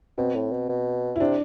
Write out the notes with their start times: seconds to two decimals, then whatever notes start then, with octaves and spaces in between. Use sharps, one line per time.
0.18 B2 C4
0.35 A2
0.52 B2
0.69 B2
1.16 E4
1.20 C3 D4